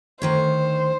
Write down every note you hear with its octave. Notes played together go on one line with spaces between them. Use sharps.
D2 D#3 C5 C#5